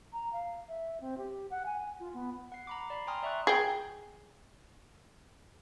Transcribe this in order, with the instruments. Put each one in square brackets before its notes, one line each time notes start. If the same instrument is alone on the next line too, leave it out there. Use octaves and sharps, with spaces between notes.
[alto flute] A#5
F5
E5
C4
G4
F#5
G#5
F4
B3
[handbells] F#5 C7
A#5 B5 D6
D5 B5 C7
G5 G#5 A#5 C6 D#6 F6
D5 E5 C6 C#6 F#6
[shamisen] G#4 G5